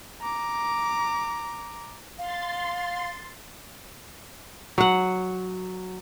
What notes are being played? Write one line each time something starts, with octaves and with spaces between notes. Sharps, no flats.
A#5 D6
F5 C6 A6
F#3 F#5